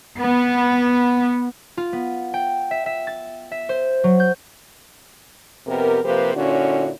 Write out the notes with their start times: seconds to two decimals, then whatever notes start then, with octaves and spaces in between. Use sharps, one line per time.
0.20 B3
1.77 F4
1.93 B3
2.34 G5
2.71 E5
2.86 E5
3.07 A6
3.51 E5
3.69 C5
4.04 F#3
4.20 G6
5.67 F2 C3 B3 G4 A#4
6.03 C3 F3 A#3 G4 B4 C5
6.35 A#2 D3 C#4 E4 F#4 C#5